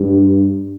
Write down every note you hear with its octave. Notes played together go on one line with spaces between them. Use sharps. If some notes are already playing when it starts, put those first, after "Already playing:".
Already playing: G2